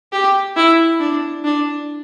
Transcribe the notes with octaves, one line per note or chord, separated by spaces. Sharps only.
G4
E4
D4
D4